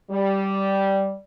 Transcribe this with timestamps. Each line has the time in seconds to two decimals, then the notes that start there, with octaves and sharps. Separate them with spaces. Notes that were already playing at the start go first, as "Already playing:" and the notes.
0.11 G3